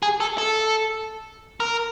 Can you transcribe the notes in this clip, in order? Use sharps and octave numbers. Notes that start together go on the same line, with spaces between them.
G#4
A4
A4
A#4